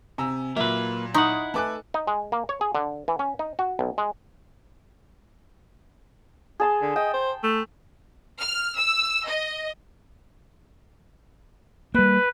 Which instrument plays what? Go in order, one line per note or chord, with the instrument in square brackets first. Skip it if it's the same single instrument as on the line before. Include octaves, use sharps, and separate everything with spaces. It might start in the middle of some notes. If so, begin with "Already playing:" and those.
[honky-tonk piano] C3 [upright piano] G#5 A#5 E6
[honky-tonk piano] A#2 F#3 [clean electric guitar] A#3 B4 [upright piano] E5
[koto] D#4 [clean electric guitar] E4 F#5 [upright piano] C6 C#6 D#6
[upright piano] A3 B4 G#5 [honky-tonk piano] A4 D6 F#6
[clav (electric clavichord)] D#4
G#3
A#3
C#5
G#4
D3
E3
C#4
D#4
F#4
B1
G#3
[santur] G#4 A5 C6
[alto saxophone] D3
[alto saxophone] D#5 [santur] G5
[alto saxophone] C5
A3
[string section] F6
E6
D#5
[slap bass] G3 A#3 [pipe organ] B4